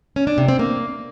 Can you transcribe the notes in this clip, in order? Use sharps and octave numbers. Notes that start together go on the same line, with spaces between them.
C#4
D4
C3
C4
A#3